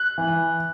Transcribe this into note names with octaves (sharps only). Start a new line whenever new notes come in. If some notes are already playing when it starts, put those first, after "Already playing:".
Already playing: F#6
E3